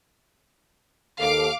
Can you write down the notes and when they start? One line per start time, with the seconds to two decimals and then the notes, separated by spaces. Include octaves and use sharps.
1.20 D#2 A4 F5 D6